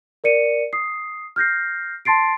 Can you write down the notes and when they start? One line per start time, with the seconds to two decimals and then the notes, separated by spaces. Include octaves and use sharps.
0.24 A#4 D5 C#7 D#7
0.73 D#6 C7
1.36 F6 G6 A#6 C7
2.05 A5 C6 A6 C7 D7